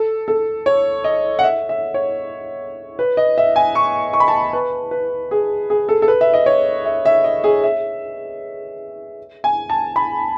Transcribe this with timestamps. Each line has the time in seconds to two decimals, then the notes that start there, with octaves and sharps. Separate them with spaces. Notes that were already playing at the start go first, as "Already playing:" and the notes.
Already playing: A4
0.28 A4
0.66 C#5
1.04 D#5
1.39 F#5
1.43 E5
1.69 E5
1.94 C#5
2.99 B4
3.17 D#5
3.38 E5
3.56 G#5
3.75 C#6
4.13 C#6
4.20 B5
4.28 A5
4.53 B4
4.91 B4
5.31 G#4
5.70 G#4
5.89 A4
6.02 A4
6.08 B4
6.21 E5
6.34 D#5
6.46 C#5
6.85 E5
7.05 E5
7.24 D#5
7.44 G#4
7.63 E5
9.44 G#5
9.70 A5
9.96 B5